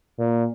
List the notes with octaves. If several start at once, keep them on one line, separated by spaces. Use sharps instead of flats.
A#2